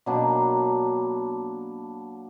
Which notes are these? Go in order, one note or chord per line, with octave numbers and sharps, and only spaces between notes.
B2 F#3 A#3 D4